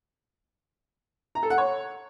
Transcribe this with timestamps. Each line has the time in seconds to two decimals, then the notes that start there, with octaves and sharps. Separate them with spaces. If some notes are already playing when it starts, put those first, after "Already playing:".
1.35 A#5
1.43 A4
1.50 F#5
1.58 C#5